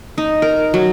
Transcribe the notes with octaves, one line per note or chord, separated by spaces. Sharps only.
D#4
A#4
F#3